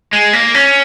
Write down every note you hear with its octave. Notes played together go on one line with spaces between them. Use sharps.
G#3
A#3
C#4